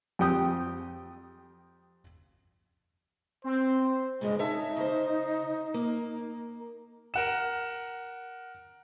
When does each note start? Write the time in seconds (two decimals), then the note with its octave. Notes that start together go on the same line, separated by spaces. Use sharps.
0.19 F2 G4 G5 D#6
3.44 C4 C5
4.21 G2 A#2 C#3 G#3
4.39 D#4 C#5 E5 A5
4.77 C#3 C5
5.74 A#3
7.14 A#4 F#5 E7